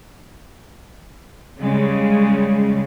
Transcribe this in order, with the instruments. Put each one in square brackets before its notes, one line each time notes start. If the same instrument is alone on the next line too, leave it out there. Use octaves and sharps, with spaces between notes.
[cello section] C#3 G3 G#3